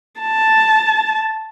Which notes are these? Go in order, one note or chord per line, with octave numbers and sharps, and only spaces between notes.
A5